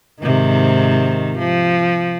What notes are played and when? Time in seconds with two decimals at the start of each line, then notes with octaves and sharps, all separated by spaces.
0.21 G#2 C3 D#3
1.38 F3